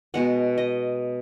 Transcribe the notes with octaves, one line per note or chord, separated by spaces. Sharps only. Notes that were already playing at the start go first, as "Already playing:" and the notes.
B2 G#3 B3 F#5
D#5